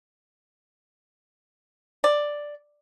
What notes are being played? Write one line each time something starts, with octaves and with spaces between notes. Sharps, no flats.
D5